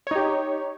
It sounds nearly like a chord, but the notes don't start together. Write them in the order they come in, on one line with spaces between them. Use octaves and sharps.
C#5 D#4 G4